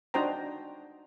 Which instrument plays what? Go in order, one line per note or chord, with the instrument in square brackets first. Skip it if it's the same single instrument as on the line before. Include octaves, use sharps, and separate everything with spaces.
[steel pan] D4 D#4 F#4 C5 G5 A#5